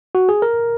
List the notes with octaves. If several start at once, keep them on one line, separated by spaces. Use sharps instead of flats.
F#4
G#4
A#4